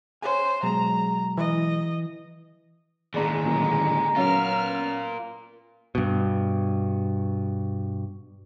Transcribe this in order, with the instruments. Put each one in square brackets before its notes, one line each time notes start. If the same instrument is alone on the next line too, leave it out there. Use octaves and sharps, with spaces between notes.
[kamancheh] C5 [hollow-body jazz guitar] C#5 G#5
[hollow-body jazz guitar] B2 F#3 G#3 [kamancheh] A#5
[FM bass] E3 [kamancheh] D#5
[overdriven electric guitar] D#2 A2 [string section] D3 G#3 [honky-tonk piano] G#4 D5 A#5
[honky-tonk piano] A1 A#2 F#3 [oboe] A#5
[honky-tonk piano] F#3 C#4 [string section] B3 F6 [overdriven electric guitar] F4 A#4
[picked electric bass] G2 B2